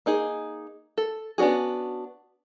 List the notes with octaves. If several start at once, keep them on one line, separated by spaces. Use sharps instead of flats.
A#3 D#4 G#4
A4
B3 C#4 D4 F#4 G#4